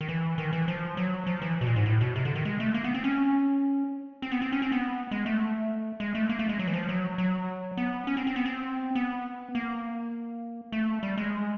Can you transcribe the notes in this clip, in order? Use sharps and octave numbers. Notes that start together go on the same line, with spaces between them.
D#3
E3
D#3
E3
F3
F#3
F3
E3
B2
A#2
G#2
A2
B2
C3
D3
D#3
G#3
A3
A#3
B3
C4
C#4
C4
B3
C4
C#4
C4
B3
G#3
A3
G#3
A3
A#3
A3
G#3
F#3
E3
F3
F#3
F#3
B3
C#4
C4
C4
B3
C4
B3
A#3
A3
G3
G#3